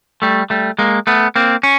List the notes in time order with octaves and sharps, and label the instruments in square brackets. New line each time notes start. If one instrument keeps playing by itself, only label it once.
[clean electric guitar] G3 A3
G3 A3
G#3 A#3
A3 B3
A#3 C4
C#4